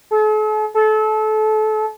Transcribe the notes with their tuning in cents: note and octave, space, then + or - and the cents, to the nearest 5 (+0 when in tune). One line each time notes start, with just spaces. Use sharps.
A4 -45
A4 -30